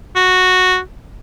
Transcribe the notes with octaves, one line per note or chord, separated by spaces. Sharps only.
F#4